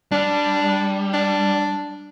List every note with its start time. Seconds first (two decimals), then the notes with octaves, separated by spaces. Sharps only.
0.12 G3 D4
1.14 D4